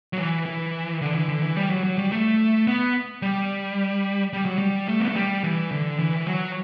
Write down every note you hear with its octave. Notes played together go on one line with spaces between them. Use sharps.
F#3
E3
E3
D3
E3
D3
E3
G3
F#3
F#3
G3
A3
B3
G3
G3
F#3
G3
A3
B3
A3
G3
E3
D3
E3
E3
F#3